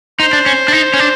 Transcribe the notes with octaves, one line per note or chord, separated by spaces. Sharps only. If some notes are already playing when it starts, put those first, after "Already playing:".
D#4 C5
D4
C#4
D4
D#4
C#4
D4